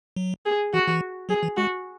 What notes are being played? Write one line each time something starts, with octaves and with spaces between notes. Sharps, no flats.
F#3
G#4
E3 F#4
E3
F#3 G#4
E3
G#3 F#4